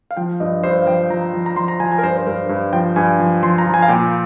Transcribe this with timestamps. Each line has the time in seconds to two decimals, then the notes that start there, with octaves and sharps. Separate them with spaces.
0.11 F5
0.17 F3 G5
0.40 G2 D#5
0.63 G2 C5
0.82 F5
0.86 F3 G5
1.10 F3 A#5
1.33 F3
1.46 A#5
1.56 F3 C6
1.68 A#5
1.80 F3 G#5
1.92 G#5
1.98 A#4
2.03 G2 C5
2.18 C5
2.27 G2 A#4
2.49 G2
2.73 F3 G5
2.96 G2 G#5
3.20 F3
3.43 F3 C6
3.58 A#5
3.66 F3
3.74 G#5
3.82 F5
3.88 A#2 G5